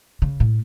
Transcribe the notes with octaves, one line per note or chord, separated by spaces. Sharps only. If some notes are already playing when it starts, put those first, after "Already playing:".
C#3
A2